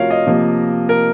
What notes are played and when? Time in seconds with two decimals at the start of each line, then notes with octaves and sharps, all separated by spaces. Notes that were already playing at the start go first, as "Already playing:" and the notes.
Already playing: C3 F3 A3 F4 F#4 A#4 C#5 F5
0.11 D#5
0.26 C3 F3 A#3
0.89 A#4